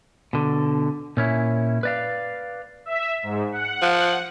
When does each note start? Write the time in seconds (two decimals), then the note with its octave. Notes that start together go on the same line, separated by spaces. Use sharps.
0.33 B2 D3
1.17 A#2 C#4 E4
1.83 B4 D5 F5
2.86 E5
3.23 G#2
3.52 F#5
3.82 F3